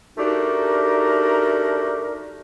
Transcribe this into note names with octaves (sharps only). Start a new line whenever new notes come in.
A3 D4 D#4 F#4 G4 A#4